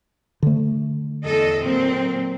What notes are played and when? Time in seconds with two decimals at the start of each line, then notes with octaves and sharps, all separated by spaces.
0.43 D3 A3
1.25 E2 A4 D#5
1.62 A#2 F#3 C4